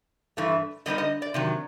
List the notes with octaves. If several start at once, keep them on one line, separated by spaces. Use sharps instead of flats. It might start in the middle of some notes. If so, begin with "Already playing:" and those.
G2 E3 A3
D3 G3 B3 D#4 D#5
D#5
D5
C3 D#3 F#3